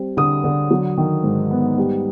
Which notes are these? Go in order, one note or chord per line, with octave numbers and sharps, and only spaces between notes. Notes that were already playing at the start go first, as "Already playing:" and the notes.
Already playing: G3 C4
D3 D#6
D3
F#3
D#3
G#2
B3
G3